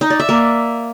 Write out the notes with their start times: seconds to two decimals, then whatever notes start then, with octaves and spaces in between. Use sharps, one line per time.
0.01 D#4
0.10 D5
0.20 E5
0.29 A#3